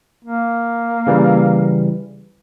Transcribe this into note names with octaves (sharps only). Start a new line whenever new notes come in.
A#3
C#3 E3 G3